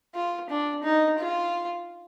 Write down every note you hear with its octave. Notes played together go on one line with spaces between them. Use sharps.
F4
D4
D#4
F4